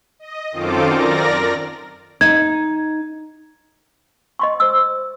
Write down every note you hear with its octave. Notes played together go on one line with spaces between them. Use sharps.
D#5
F#2 D#3 C4 F4 A4 D6
A#4 D5 A#6
D#4 G#6
D#5 C6 C#6
C5 E6